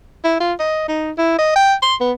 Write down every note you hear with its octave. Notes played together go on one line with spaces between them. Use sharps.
E4
F4
D#5
D#4
E4
D#5
G5
C6
B3